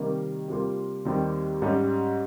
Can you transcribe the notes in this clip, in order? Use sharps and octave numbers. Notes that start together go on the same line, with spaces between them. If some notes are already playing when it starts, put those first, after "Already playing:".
Already playing: C3 D#3 G3 A#3
C3 G3 A#3 F4
D#2 D#3 G3 C4 G4
G#2 G3 C#4